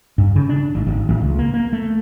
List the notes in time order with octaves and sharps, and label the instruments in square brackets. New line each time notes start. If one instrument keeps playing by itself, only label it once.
[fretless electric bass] G2
C#3
D4
G#1
G#1
A1
C#2
A#3
A#3
A3